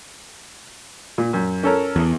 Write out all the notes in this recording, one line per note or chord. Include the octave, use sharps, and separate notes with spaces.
A#2
F#2
C#4 A4 A#4
E2